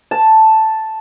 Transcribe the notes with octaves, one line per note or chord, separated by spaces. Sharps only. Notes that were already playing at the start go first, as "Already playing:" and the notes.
A5